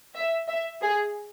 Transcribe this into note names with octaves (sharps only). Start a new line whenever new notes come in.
E5
E5
G#4